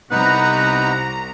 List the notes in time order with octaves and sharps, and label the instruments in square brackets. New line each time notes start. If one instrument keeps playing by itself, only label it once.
[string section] C2 A#5 [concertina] B3 D#4 B4 [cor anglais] F#5